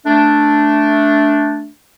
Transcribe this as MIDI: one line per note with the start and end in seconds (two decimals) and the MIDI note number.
0.06 1.67 57
0.06 1.67 62